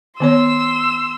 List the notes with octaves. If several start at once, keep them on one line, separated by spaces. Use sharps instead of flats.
D#3 B3 C#5 C6 E6